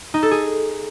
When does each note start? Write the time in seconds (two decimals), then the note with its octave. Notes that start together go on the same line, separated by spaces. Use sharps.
0.14 D#4
0.23 A4
0.31 G#4